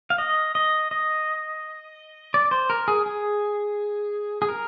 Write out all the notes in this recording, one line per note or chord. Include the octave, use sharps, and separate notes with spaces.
F5
D#5
D#5
D#5
D5
C5
A#4
G#4
G#4
G#4
A#4